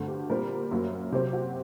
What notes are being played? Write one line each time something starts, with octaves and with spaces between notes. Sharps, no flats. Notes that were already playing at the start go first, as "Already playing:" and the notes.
Already playing: G2 D3 A3 C4 F#4
G4
A#2 G3 C4 A#4
F#2 F#3 A#3
C3 F#3 C4 G4
F#4